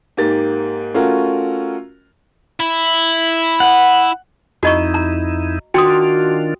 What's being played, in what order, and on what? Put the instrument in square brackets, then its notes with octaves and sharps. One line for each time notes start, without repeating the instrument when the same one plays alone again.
[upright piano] G#2 A#3 G4 A6
A3 C#4 F4 F#4 A#4
[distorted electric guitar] E4
[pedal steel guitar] F#5
[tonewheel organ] F2 D#4 E4 [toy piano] F#4 D#5 C#6
[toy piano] A#5
[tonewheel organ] D#3 D4 F4 [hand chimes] F#4 [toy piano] G5 C6 D#6